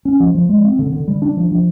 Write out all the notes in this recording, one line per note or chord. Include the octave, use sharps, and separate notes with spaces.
C#4
F3
F3
G#3
C4
D3
D3
G3
D4
F3
F3